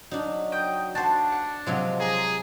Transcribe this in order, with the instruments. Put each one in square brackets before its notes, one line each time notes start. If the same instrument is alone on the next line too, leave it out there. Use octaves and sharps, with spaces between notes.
[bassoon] F#3 [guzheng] D4 D#4
[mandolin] D#5 G5
[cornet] D4 [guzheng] F#4 C5 [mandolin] A5
[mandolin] F#5
[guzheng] C3 F#3 G#3 [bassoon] F3
[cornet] G#4 [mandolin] A#5